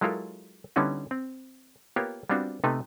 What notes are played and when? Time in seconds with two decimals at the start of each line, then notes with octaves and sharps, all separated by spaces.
0.01 F#3 G#3 E4 F4 A4 A#4
0.76 D3 G3 B3 C#4 D#4 E4
1.11 C4
1.96 A#3 B3 F4 G4 A#4 C#5
2.30 G3 B3 C4 D4 F4 F#4
2.64 C3 A3 B3 D#4 A4 B4